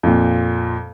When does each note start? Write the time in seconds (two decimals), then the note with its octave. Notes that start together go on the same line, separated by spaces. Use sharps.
0.03 F2 A#2